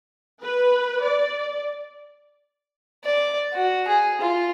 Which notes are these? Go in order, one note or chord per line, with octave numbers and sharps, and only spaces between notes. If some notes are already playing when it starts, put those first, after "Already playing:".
B4
D5
D5
F#4
G#4
F4